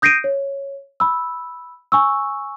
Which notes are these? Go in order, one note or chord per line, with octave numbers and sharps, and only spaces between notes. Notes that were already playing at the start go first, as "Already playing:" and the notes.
D#6 G6 A#6 C7 D7 D#7
C#5
B5 E6
G#5 C#6 E6